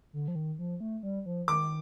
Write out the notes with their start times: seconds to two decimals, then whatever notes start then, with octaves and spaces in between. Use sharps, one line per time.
0.13 D3
0.28 F3
0.35 D#3
0.59 F3
0.80 A3
1.03 G3
1.26 F3
1.48 D#3 D6